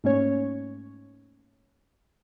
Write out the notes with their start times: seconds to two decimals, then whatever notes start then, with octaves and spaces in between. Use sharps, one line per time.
0.04 G#2 A3 A#3 C#4 C#5